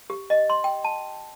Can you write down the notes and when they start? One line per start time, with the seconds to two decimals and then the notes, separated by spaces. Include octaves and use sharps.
0.10 G4
0.30 D#5
0.50 C6
0.64 G5
0.84 A5